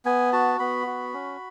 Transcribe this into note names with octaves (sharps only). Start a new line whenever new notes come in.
B3 G#5
F#4 A5
B3 B5
F#4
C#4